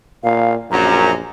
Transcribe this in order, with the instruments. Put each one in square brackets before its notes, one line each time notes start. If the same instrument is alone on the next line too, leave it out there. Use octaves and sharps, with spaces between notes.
[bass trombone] A#2 [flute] F5
[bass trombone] A#1 [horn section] F#2 [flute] A#5